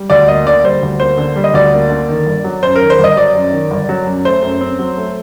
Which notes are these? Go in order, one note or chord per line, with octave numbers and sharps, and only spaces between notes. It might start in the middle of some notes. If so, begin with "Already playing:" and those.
Already playing: G3
D2 D5
A#3 D#5
D3 D5
G3 C5
D2
A#3 C5
D3
G3
D#5
D2 D5
A#3
D3
D#3
G1
F#3
F#2 C5
A#4
D#3
C5
G1 D#5
F#3 D5
F#2
D#3
G1
F#3
F#2
A3 C5
F#2
C4
F#3
A3